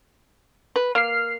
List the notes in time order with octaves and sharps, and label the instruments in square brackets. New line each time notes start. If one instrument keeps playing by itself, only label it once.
[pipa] B4
[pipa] A#3 [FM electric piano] F6 C7